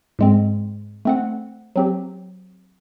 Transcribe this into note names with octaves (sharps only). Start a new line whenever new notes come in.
G#2 G#3 C4
A3 C4 F#5
F#3 C4 G4